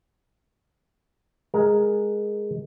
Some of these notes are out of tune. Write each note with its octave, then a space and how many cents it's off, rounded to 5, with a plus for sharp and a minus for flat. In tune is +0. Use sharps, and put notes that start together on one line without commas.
G#3 +0 A#4 +0